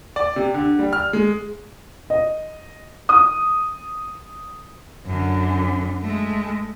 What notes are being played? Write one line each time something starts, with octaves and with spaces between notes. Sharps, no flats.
D5
C3
D3
G3
F6
G#3
D#5
D#6
F#2 D3
G#3 A3